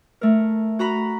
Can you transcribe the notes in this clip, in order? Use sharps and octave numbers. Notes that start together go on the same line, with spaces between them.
A3 A#4
F#4 A#5 B5